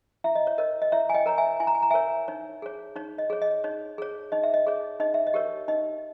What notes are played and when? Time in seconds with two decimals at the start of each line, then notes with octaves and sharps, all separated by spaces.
0.24 E4 E5
0.35 D#5
0.47 C#5
0.58 A#4 C#5 D#5
0.82 D#5
0.92 E4 C#5 E5
1.10 G#5
1.14 D#5 G5
1.26 A#4 C#5 A#5
1.38 E5 G#5
1.60 E4 G#5
1.67 A#5
1.75 G#5
1.82 A#5
1.91 A#4 C#5 E5 G#5
2.28 D#4 C#5
2.62 G#4 C#5
2.96 D#4 C#5
3.18 D#5
3.30 G#4 C#5
3.42 D#5
3.64 D#4 C#5
3.98 G#4 C#5
4.32 D#4 D#5
4.43 E5
4.54 D#5
4.67 G#4 C#5
5.00 D#4 D#5
5.14 E5
5.27 D#5
5.34 G4 A#4 C#5
5.68 D#4 D#5